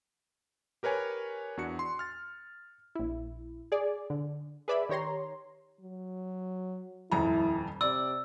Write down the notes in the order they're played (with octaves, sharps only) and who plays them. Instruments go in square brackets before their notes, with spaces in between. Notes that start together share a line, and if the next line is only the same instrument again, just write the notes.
[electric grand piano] G4 A#4 B4 C#5 G#5
E2 D4 F#4 F#6 C#7
C6
F6 A6
[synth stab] A#1 E4
G#4 D5
D3
G#4 B4 D5 E5 B5
D#3 G4 C#5 A#5 C6
[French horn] F#3
[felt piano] D#1 F2 A#5 [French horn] E4
[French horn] C3 [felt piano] D5 [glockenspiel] E6